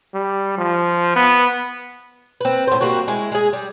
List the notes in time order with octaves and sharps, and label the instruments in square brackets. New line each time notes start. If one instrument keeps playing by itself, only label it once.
[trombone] G3
F3
B3
[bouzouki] C4 B4
A2 C5
G3 A#3 C4 F#4
G#3 E4
G#3 G#4
G3